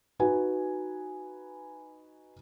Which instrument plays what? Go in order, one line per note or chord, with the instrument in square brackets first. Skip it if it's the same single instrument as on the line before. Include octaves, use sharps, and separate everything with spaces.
[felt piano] D#4 F#4 B4 G#5